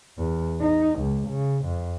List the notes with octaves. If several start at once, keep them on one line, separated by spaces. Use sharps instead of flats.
E2
D#4
C#2
C#3
F2